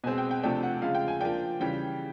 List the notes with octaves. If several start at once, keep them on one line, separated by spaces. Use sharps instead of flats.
B2 G#3 C4 G#5
G5
G5
C3 F3 A3 D4 G5
F#5
C#3 F3 G#3 F5
G5
G#5
F3 A#3 D4 G5
C#3 E3 G3 G5